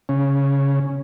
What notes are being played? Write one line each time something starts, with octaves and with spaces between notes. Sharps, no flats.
C#3 C#4